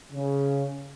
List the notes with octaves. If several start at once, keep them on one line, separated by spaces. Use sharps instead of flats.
C#3